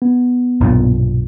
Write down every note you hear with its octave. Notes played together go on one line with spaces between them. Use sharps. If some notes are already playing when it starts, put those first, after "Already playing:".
B3
B1 G2 A#2